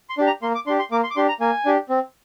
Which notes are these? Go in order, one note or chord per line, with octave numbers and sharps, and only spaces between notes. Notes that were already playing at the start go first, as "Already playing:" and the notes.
C6
D4 G4
A#5
A#3 C6
D6
D4 G4 C6
C6
A#3 D6
C6
D6
D4 G4 C6
A#5
A#3 G#5
D4 G4
C4